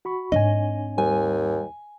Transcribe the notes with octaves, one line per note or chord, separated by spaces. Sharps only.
F#4 B5 C#6
G#2 C4 D4 C#5 D#5 G#5
D#2 G3 C5 G#5